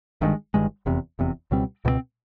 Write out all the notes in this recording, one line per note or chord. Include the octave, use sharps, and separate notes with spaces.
G1 G2 D#3 G#3
G1 G2 D#3 G#3
F1 E2 C3
F1 E2 C3
C#2 B2 G3 C4
C#2 B2 G3 C4